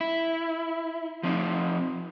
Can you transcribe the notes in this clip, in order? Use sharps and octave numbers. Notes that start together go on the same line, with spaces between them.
E4
F3 C4 D#4